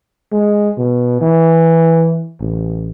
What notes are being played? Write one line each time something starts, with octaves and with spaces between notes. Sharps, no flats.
G#3
B2
E3
A1